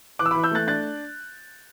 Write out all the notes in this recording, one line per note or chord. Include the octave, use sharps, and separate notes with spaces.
E3 D6 F#6
E6
E3 B5 D6
E6 G6
A3 F#6 A6
D4 F#6 A6